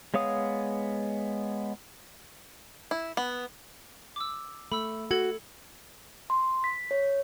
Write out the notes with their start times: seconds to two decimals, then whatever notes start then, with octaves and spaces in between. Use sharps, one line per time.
0.14 G#3 B3 C#5 F5 D#6
2.91 E4
3.17 B3
4.16 D6 E6
4.72 A3 B5 E6
5.11 F#4 A4 G#6 C#7
6.30 C6
6.64 B6
6.91 C#5